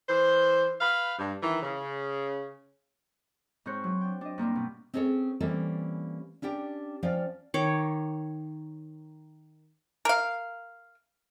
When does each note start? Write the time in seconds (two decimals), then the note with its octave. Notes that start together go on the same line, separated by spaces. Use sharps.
0.08 E3 C5
0.80 B4 F5
1.18 G2
1.42 D#3 E3
1.62 C#3
3.66 G#2 C4 C5 C#5 F#6
3.84 F#3
4.01 D4 G5
4.21 D4 D#5
4.38 G2 A#3 C4 D4
4.56 B2
4.94 C4 C#4 G#4 A4 C#5
5.40 E3 G3 A#3 C4 C#4 A4
6.42 C#4 D4 G4 G5
7.03 F3 C#4 D5 F5 G5
7.54 D#3 C#5 D6
10.05 A#4 F5